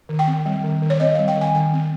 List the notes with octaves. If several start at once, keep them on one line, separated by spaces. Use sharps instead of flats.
D#3
G5
C4
G3
D#3
D#3
C#5
C4 D#5
G3 F5
G5
D#3 G#5
D#3 G#5
C4